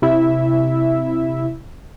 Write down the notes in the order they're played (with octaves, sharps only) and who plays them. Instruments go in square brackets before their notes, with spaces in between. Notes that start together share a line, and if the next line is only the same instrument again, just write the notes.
[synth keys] C3 E4 E5